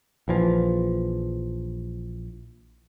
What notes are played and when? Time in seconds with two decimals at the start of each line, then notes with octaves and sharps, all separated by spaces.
0.28 A#1 E3 F3